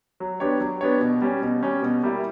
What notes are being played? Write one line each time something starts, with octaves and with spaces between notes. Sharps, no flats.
F#3
B3 D4 G4 C#5
F#3
B3 D4 G4 C#5
B2
G3 C#4
B2
G3 C#4
B2
G3 A#3 E4